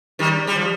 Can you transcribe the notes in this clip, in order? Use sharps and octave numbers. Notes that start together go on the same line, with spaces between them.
D#3 G3
G3
F3